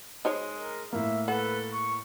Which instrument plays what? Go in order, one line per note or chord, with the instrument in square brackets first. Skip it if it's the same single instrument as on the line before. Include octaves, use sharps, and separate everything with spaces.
[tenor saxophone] G#3 [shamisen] D#4 C5 C#5
[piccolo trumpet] A#4
[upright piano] A2 A#3 [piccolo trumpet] E5
[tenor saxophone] A4 [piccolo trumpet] B4 [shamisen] F#5
[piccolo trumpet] C#6